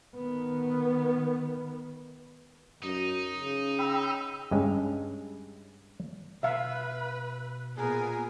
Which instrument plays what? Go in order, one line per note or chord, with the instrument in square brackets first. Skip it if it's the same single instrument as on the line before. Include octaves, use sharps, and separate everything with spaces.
[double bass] D#3 B3
[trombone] F#2 [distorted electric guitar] D#4
[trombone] C#3
[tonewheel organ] G5 B5 E6
[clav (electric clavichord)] G2 G#3 C#4
[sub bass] B2 [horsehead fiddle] B4 [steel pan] E5 F5
[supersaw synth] A#2 G#4 G#5 [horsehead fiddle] B3 A#4